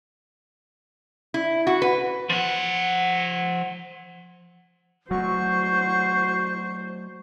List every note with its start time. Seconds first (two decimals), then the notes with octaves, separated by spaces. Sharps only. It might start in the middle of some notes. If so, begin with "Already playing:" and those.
1.34 E4
1.67 F#4
1.82 B4
2.30 F3 F#5
5.11 F#3 A3 F#4 C5 C#6